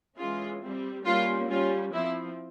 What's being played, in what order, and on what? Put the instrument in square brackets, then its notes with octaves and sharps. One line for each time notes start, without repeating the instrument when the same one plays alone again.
[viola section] E3 G#3 C#4 F4 G#4
G3 C4
G3 A#3 C#4 F4
G3 C#4 F4
F3 C4 E4